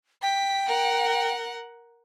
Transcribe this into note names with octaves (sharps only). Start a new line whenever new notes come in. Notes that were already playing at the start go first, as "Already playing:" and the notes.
G5 B6
A#4 F#5